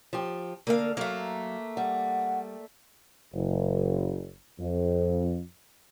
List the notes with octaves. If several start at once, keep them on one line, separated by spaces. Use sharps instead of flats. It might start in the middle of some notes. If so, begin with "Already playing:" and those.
F3 G4
D3 A#3 A#4 F5
F#3 A3 A#3 F5
G3 F#5
F#1
F2